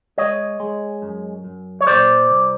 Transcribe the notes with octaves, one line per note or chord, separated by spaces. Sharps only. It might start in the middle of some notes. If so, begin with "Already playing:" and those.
G#3 C#5 D#5
G#3
F#2
F#2
C#5
A#2 C5 D5
C2